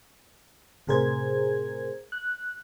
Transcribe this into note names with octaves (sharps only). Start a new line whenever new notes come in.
A2 C3 G#4 A#4 C5 G#6
F#6